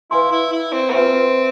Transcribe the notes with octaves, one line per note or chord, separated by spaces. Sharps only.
E4 B4 F5 G#5 C6
E4
E4
C4
B3
C4 F4 B4 E5 G#5